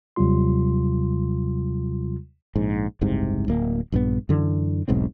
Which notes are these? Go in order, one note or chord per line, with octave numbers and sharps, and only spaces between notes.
D#2 C3 F#3 G3 F4 C6
A#1 G#2
F#1 C2 G#2 C3
D1 A#3
A#1 G2 F#3 B3
F#2 D3 E3
E1 B1 G#2 C4